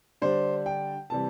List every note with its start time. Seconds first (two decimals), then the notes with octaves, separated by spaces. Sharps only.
0.22 D3 G3 D4 C5
0.66 G5
1.10 C3 E3 G3 A5